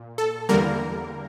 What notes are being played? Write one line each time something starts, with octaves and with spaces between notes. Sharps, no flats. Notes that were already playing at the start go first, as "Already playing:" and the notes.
Already playing: A#2
A4
E2 D3 G3 A#3 A#4